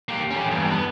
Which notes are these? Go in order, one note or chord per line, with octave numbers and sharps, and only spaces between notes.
A#3 G4
C#4 G4
E2 G2
B3